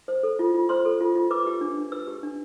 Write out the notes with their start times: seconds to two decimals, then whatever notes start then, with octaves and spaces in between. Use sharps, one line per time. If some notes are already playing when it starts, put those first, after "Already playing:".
0.08 C5
0.23 A4
0.39 F4
0.54 F4
0.69 C5 C6
0.85 A4
1.01 F4
1.15 F4
1.31 B4 D6
1.46 G4
1.61 D4
1.77 D4
1.92 B4 E6
2.08 G4
2.23 D4